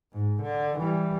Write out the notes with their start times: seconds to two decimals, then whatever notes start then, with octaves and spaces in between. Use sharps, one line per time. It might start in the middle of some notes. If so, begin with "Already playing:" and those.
0.12 G#2
0.42 D3
0.78 E3 G3